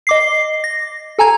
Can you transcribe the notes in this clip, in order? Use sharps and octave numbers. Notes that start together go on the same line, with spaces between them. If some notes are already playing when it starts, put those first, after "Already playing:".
D#5 D6 C7
A#6
A4 G#5 A#5 G#6